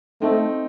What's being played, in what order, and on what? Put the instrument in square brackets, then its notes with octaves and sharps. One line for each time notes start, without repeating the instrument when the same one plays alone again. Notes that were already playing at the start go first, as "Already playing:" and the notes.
[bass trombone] A3 [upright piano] C4 D#4